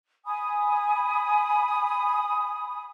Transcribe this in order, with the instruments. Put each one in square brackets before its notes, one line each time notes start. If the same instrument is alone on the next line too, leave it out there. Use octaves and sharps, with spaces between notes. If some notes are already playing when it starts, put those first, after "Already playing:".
[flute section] G#5 B5 D#6